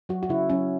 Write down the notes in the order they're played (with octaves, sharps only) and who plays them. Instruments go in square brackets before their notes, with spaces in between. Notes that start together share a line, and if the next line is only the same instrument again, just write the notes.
[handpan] F#3 F#4
F#4
C#3 E4
F#3 C#4